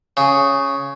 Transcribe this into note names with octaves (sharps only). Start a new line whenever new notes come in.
C#3